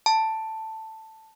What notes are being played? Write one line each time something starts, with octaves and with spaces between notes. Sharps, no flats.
A5